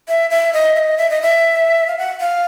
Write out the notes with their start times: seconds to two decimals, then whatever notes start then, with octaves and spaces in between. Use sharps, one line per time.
0.08 E5
0.30 E5
0.53 D#5
0.75 E5
0.79 D#5
0.98 E5
1.10 D#5
1.22 E5
1.87 F5
1.98 F#5
2.20 F5